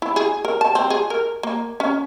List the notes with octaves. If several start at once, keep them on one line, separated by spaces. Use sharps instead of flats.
E4
G#4
A#4
A5
C4
G#4
A#4
A#3
C#4